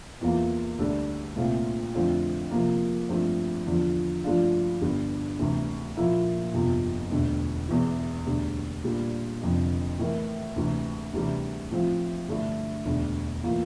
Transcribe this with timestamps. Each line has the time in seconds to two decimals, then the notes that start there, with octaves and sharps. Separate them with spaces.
0.21 E2 E3 A#3 F4
0.79 D2 D3 G3 D4 A4
1.36 C2 A#2 A3 C4 F4
1.94 F2 D3 A3 C4 F4
2.51 C3 F3 A#3
3.09 G2 F3 A3 C4
3.66 E2 D3 F3
4.24 G2 F3 A3 D4 F4
4.81 G1 G2 D3 G3
5.39 D2 C3 E3
5.97 A#2 F3 A#3 E4
6.53 G1 F2 C3 F3
7.11 E1 D2 D3
7.68 E1 E2 E3
8.26 E1 D2 D3 G3
8.83 A#2 G3 D4
9.42 F1 F2 D3
9.99 A2 E3 A3 E4 A#4
10.56 D2 C3 E3
11.13 D2 C3 E3 G3
11.71 A2 F3 C4 F4
12.29 G2 D3 A3 E4
12.85 E1 D2 D3
13.43 A2 E3 A#3 F4